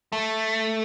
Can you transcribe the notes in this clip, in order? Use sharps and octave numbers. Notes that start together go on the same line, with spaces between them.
A3